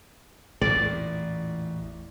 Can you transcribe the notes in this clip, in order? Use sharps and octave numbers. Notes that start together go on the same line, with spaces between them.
A1 E2 A#2 D5